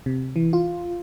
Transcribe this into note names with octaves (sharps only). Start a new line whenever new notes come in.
C3
E3
F4